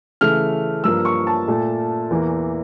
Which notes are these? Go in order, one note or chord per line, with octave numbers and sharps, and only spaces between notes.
C#3 E3 A3 F6
G2 F3 A#3 E6
C#6
A5
A#2 A3
E2 E3 A#3